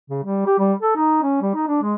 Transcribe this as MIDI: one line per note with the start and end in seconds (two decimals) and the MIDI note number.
0.10 0.21 49
0.24 0.44 55
0.47 0.54 67
0.59 0.73 55
0.82 0.94 69
0.96 1.22 63
1.23 1.39 61
1.42 1.52 55
1.55 1.65 63
1.68 1.82 62
1.82 1.95 56